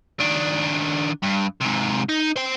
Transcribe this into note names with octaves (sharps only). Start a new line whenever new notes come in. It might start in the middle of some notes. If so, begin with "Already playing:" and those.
D#3 D4
G2
G#2 C3
D#4
C5 G5